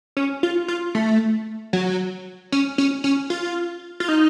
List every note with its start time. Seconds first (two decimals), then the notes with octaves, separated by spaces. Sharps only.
0.17 C#4
0.43 F4
0.68 F4
0.95 A3
1.73 F#3
2.52 C#4
2.78 C#4
3.04 C#4
3.30 F4
4.00 F4
4.09 D#4